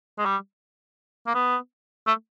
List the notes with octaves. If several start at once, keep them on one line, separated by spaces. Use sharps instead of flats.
G#3
G3
A#3
B3
A3